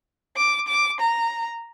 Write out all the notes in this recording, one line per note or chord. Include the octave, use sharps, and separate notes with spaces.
D6
D6
A#5